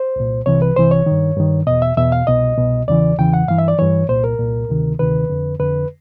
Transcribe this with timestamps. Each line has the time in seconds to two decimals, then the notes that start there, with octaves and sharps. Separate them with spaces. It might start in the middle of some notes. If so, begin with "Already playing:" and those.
Already playing: C5
0.16 C2 A#2
0.46 C2 C3 E3 C#5
0.62 B4
0.76 C2 C3 E3 C5
0.91 C#5
1.06 G2 D#3
1.37 G2 D#3
1.67 E2 B2 D#5
1.82 E5
1.97 E2 B2 E5
2.12 F5
2.27 C2 B2 D#5
2.57 C2 B2
2.88 E2 C#3 E3 D5
3.18 E2 C#3 E3 G5
3.34 F#5
3.48 G2 E3 F5
3.58 E5
3.68 D5
3.79 G2 E3 C#5
4.09 C2 A#2 C5
4.24 A#4
4.39 C2 A#2
4.69 D2 C3 D#3
4.99 D2 C3 D#3 B4
5.30 F2 D3
5.60 F2 D3 B4